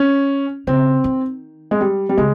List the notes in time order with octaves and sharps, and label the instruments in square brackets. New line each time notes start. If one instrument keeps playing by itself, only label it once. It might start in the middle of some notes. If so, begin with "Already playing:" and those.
Already playing: [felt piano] C#4
[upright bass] C#3 [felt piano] C4
[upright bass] D#3
[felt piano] G#3
G3
G3
[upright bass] C#3 [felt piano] G#3